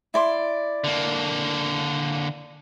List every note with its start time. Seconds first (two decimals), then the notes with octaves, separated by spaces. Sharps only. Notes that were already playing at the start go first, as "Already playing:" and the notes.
0.14 E4 D5 C6
0.84 D3 A#3